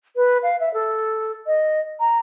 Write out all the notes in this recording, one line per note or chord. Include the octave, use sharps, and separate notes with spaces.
B4
F5
E5
A4
D#5
A#5